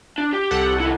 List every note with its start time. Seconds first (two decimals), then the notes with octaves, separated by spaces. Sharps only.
0.18 D4
0.33 G4 G5
0.51 C2 A4 F#5
0.80 D#3 E4